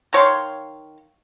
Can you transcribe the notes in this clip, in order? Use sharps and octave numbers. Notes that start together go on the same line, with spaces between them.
D#3 C#5 F5 C6